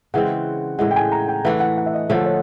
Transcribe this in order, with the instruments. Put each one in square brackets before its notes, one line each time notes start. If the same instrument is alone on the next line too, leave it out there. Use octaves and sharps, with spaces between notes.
[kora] C#3 E3 G#3 C4 [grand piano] F#5
[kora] A2 E3 G#3 [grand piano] F#5
[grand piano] G5
G#5
A#5
G5
[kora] E3 A3 D4 [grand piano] F#5
[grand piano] F#5
F#5
E5
D#5
[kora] D3 F3 A3 [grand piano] C#5
[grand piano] C#5